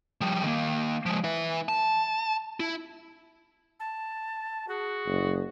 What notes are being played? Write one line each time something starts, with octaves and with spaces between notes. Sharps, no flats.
F3 G3
D#3 A#3
F3 G#3
E4 B4
A5
E4
A5
F#4 G#4
F#1